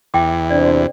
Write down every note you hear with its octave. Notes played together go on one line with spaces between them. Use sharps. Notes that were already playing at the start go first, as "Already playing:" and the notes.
E2 E5 G5 D6
C3 D4 C5 D5